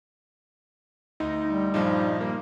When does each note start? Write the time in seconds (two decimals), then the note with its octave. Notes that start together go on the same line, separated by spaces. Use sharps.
1.20 D2 D#4
1.46 G3
1.74 G2 A#2 F3 D#4
2.21 A#3